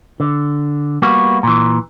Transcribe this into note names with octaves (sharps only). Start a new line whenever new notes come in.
D3
G3 A#3 B3 F#4
A#2 E3